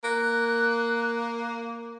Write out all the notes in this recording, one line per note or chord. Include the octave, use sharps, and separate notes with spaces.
A#3 F#6